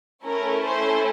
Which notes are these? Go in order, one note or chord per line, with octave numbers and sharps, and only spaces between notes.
A3 C#4 E4 A4 A#4
C5